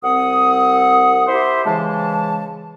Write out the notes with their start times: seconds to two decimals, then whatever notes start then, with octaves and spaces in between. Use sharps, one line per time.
0.04 C2 C4 F#5 D#6
1.28 E4 G4 C5 E5 C6
1.66 C#3 E3 G#3 A5